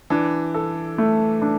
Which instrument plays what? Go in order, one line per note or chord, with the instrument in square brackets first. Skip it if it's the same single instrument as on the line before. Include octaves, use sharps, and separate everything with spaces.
[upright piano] E3 [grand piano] D4
[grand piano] A4
A3
D4